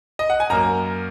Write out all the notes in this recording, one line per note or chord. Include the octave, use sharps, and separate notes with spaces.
D#5
F#5
G#5
F#2 F#3 A#3 A#5